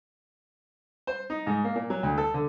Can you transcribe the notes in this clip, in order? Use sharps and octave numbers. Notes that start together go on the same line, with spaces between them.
C5
D#4
G#2
A#3
A#2
F#3
D2
A4
D3